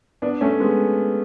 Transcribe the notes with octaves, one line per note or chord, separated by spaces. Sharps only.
B3 D4
A3 C#4
G#3 B3